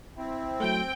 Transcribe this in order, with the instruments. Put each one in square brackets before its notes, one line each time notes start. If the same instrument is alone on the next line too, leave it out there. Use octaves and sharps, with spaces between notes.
[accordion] C4 [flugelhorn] E4
[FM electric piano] F#3 A3 [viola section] G5